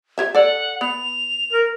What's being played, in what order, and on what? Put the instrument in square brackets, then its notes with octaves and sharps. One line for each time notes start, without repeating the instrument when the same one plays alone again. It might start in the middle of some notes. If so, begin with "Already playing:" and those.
[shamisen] G4 C#5 E5
[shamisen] A4 D5 [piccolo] F#5
[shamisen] B3 [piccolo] F7
[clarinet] A#4